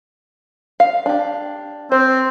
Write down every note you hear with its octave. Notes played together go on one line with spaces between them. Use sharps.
F5
D4 G4
C4 C5